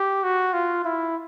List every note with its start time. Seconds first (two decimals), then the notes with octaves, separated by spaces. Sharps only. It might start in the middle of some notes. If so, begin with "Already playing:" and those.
Already playing: G4
0.24 F#4
0.53 F4
0.85 E4